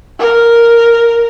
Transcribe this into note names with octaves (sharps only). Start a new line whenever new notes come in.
A#4